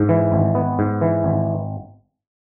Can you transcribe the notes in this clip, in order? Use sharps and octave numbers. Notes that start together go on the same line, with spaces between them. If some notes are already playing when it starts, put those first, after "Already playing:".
Already playing: G#2
E3
G#1
B3
G#2
E3
G#1